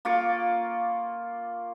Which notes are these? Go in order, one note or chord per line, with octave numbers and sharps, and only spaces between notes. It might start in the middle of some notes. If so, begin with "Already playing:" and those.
A#3 F4 C#6 D6